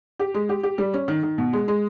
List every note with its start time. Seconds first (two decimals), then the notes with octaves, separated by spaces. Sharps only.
0.19 G4
0.34 G#3
0.49 G4
0.63 G4
0.78 G3
0.94 C#4
1.08 D#3
1.23 D#3
1.38 B2
1.53 G#3
1.68 G#3